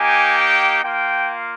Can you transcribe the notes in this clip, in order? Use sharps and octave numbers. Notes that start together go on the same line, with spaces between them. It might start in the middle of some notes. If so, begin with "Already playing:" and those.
Already playing: A#3 D#4 G4 G#5
G5
A#3 F4 G5